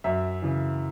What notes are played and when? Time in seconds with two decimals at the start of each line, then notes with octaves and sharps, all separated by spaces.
0.04 F#2 E5
0.42 C#3 E3